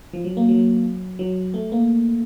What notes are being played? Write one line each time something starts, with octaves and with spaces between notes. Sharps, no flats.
F3
F#3
A#3
F#3
F#3
A3
A#3